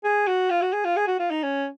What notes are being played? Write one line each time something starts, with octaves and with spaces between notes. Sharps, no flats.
G#4
F#4
F4
F#4
G#4
F4
G#4
F#4
F4
D#4
C#4